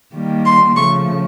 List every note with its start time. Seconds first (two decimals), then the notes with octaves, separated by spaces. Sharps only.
0.14 D#3 G3 A#3
0.45 C6
0.76 C#3 F3 A3 C#6